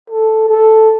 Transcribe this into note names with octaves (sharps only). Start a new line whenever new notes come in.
A4
A4